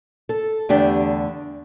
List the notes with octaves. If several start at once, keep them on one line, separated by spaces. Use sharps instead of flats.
A4
E2 D3 A3 D4 G4